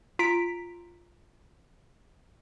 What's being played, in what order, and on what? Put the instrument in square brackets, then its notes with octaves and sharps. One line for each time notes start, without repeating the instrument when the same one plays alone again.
[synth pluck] F4 A#5 B6 D7